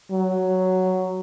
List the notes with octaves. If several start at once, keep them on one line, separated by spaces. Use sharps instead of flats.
F#3